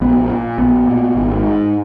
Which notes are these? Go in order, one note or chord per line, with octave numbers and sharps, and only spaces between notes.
A#1 B3
A#2
A#1 B3
A#2
G#1
G#2